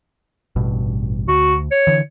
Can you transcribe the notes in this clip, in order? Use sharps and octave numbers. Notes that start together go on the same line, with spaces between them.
A1 G2 B2
D2 F#4
C#5
D3 E3